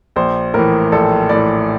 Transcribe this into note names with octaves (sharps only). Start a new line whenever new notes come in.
A#1 C5
A2 E3 A#4
A#1 A4
A2 E3 D5